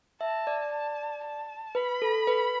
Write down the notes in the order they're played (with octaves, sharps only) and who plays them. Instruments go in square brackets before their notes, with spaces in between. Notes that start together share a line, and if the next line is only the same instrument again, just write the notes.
[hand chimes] E5 [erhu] A5
[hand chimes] D5
[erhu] A5
A5
[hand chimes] B4 [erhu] B5
[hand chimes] A4
B4